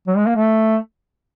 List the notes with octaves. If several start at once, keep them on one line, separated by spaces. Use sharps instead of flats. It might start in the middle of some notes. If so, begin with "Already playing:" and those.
F#3
G#3
A#3
A3